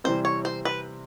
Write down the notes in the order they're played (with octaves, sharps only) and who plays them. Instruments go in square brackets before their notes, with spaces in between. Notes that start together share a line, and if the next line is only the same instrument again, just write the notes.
[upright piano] C3 E3 G3 C4 [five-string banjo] C5
[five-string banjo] C#5
C5
B4